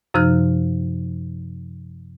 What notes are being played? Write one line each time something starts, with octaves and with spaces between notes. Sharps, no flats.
F#2 C3 F3 D#4 F6 F#6